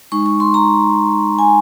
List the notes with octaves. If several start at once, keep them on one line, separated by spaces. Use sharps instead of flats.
G#3 D#4 C#6
C#6
C6
A#5
G#5